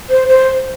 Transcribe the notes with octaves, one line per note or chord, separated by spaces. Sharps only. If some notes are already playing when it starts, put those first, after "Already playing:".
C5
C5